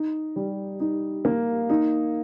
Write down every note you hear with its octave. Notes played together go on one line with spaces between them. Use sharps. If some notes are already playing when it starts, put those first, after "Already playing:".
Already playing: D#4
G3
D#4
A#3
D#4